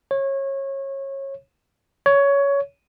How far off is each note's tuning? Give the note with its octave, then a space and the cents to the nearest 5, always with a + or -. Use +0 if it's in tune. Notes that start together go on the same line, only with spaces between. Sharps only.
C#5 -25
C#5 +15